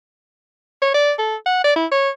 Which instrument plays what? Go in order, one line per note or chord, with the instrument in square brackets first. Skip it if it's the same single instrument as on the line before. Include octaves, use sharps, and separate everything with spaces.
[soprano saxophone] C#5
D5
A4
F#5
D5
E4
C#5